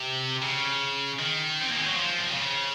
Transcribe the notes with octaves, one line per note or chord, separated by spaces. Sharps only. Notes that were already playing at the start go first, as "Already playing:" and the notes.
Already playing: C3
C#3
D#3
C4
A#3
G#3
F#3
F3
A#2
C3
C#3